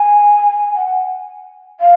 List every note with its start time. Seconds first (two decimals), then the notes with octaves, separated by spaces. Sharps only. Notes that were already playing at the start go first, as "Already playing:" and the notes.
Already playing: G#5
0.75 F#5
1.80 F5